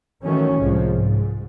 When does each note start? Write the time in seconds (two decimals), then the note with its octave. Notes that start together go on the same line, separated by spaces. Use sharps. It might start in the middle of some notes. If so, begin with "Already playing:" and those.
0.24 D#3 E3 F#3 A3 C#4
0.60 C2 A2 F3 G#3
0.91 G#2